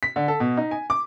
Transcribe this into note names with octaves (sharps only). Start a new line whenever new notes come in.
B6
D3
A4
B2
D#4
G#5
D6